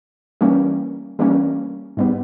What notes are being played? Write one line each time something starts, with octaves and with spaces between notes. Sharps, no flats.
E3 G3 A#3 C#4
E3 G3 A#3 C#4
G#2 G3 B3